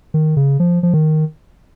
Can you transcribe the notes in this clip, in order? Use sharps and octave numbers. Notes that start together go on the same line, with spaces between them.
D#3
C#3
F3
F3
D#3